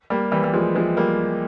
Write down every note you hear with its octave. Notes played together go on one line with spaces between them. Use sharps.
G3 A#3
E3 G3
G3
F3 G#3
F3 G#3
G3 A#3